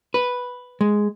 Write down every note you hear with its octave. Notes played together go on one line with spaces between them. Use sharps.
B4
G#3